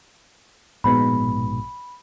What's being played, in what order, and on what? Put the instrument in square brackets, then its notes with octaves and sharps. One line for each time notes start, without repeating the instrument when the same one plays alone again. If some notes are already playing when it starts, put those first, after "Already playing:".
[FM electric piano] A#1 G#2 B2 [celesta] B5